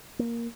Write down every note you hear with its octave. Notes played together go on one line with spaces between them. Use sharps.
A#3